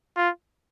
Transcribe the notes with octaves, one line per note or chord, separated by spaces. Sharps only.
F4